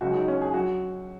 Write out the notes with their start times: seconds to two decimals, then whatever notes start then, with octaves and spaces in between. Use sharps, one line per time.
0.01 C#2 C#3 F#3 F#4
0.14 D#4
0.28 C#4
0.42 G#4
0.54 F#3 F#4